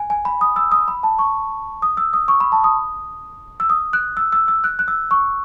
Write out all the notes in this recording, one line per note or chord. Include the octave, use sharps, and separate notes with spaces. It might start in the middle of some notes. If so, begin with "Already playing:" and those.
Already playing: G#5
G#5
B5
D#6
E6
D#6
B5
A5
C#6
D#6
E6
D#6
C#6
B5
A5
D#6
E6
D#6
F#6
E6
E6
E6
F#6
F#6
E6
C#6